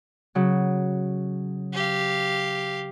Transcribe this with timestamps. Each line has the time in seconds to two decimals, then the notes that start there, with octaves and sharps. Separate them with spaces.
0.35 C#3 F#3
1.74 G4 F5